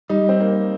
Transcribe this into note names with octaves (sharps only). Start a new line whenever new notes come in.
G3 D#4
C4
A#3